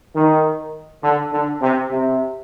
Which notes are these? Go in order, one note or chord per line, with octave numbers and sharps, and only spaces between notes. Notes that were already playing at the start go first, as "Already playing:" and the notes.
D#3
D3
D3
C3
C3